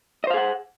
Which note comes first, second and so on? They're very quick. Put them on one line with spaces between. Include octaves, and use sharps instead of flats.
D#5 C5 F5 G#4 F#5